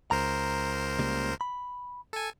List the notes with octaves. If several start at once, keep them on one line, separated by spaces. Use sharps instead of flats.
C#2 A#4 C5 A#5
C#3 G3 A#3
B5
A4 G#5